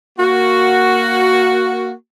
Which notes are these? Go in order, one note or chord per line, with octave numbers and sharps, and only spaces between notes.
A#3 F#4